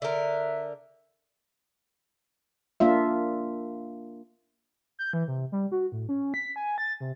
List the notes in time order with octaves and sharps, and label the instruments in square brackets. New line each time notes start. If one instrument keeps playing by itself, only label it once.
[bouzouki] D3 A#4 [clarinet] E5
[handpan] A#3 D4 F4 E5
[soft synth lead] G6
E3
C3
G3
F#4
A2
C#4
B6
G#5
A6
C3